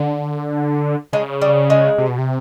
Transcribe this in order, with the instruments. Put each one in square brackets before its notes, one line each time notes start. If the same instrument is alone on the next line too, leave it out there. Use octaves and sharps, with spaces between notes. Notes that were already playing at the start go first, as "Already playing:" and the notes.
Already playing: [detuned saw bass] D3
[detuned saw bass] C#3 [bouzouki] G#3
[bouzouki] G3
G#3
[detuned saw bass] C3
B2
C3